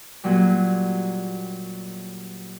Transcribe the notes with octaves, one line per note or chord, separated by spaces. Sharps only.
A#2 F#3 G3